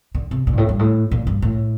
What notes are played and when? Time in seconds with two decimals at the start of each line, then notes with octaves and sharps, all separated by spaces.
0.15 D3
0.31 C3
0.47 A#2
0.53 G2
0.58 A2
0.69 G2
0.79 A2
1.11 A#2
1.27 G2
1.42 A2